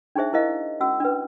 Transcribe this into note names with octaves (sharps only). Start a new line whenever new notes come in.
D4 D#4 G#4 C5 E5
E4 A#4 C5 D#5 F5
C#4 F#4 E6
D4 B4